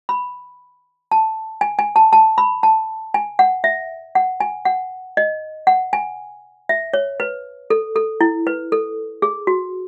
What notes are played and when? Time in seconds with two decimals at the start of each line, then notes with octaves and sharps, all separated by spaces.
0.09 B5
1.11 A5
1.61 G#5
1.79 G#5
1.96 A5
2.13 A5
2.38 B5
2.63 A5
3.14 G#5
3.39 F#5
3.64 E5
4.15 F#5
4.40 G#5
4.65 F#5
5.17 D#5
5.67 F#5
5.93 G#5
6.69 E5
6.94 C#5
7.20 B4
7.70 A4
7.96 A4
8.21 E4
8.47 B4
8.72 A4
9.22 G#4
9.47 F#4